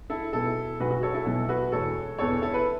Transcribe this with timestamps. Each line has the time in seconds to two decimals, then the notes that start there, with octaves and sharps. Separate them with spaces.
0.10 E4 A4
0.33 B1 B2 B3 E4 A4
0.80 B1 B2 F#3 F#4 B4
0.91 F#4
1.03 A4 C#5
1.14 E4 A4
1.26 B1 B2 F#3 E4 A4
1.49 F#4 B4
1.72 E1 E2 E3 B3 A4 C#5
2.18 E1 E2 E3 B3 A4 C#5
2.42 E4 A4
2.54 B4